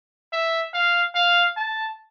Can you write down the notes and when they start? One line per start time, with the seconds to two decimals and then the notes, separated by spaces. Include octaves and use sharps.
0.33 E5
0.74 F5
1.15 F5
1.57 A5